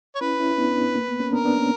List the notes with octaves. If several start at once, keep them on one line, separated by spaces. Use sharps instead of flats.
C#5
C#4 E4 B4
C#4 E4
E4
B3 D4
B3 D4
B3
A#3
B3
A#3 C#4
B3 D4 A#4
B3 D4
A#3 C#4